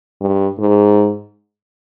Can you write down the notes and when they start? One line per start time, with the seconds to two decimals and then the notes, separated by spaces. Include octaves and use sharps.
0.21 G2
0.58 G#2